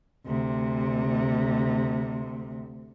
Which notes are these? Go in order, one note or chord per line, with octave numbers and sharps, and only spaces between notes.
D2 C3